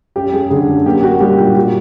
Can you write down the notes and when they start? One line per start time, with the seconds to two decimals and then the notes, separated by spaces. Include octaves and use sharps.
0.16 F#2 G4
0.32 F#2 G#4
0.50 D3 G#4
0.67 F#2
0.86 A#3 G4
1.02 A#3 F#4
1.20 G3 G4
1.38 A#2 G4
1.55 G3 F#4